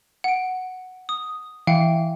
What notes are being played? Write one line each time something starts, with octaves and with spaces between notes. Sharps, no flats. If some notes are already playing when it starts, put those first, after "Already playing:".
F#5 D7
D#6
E3 F5 G5 C#7